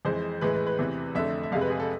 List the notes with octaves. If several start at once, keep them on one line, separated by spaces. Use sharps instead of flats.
F2 E3 G#3 C5
A2 E3 G#3 B4
B4
B4
E2 C3 E3
F2 D3 A3 E5
E5
F2 C3 G#3 F5
B4
G#4
A4